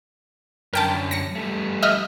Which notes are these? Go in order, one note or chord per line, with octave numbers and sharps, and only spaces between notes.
F#2 D3 A#4 G5 A5
A#6 C#7
G3 A3
D#5 E5 F6